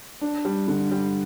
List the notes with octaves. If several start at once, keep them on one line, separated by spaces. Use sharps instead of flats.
D4
G3
D3
G3